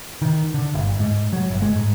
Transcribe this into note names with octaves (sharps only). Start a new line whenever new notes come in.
D#3
D3
G1
G#2
F#3
G1
G#3
G#2